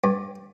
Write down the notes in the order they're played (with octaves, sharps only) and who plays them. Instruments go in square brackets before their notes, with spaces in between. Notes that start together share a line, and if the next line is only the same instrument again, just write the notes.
[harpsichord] G2